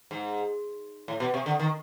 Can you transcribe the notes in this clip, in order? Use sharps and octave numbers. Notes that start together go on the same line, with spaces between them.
G#2
A2
B2
C3
D3
D#3